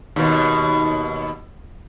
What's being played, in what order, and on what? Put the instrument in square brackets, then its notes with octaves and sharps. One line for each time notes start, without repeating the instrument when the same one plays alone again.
[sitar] D#2 B2